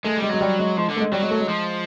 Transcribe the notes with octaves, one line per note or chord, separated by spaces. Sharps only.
G#3 A3
G3 G#3
F#3 G#3
G3
G#3
F3 G#3
D3
A3
G#3
F#3 G3
G#3
A3
G#3
F3